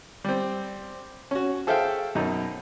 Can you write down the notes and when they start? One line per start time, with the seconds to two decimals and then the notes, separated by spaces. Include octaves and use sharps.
0.24 G3 C4
1.31 C#4 F#4
1.67 G#4 A4 C5 E5 F5 G5
2.15 F#2 B2 D#4